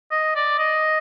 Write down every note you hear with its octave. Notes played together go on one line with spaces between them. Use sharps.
D#5
D5
D#5